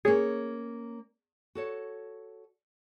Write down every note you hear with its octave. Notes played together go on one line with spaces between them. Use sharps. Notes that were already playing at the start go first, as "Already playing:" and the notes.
A#3 C#4 G#4 C#5
F#4 A4 C#5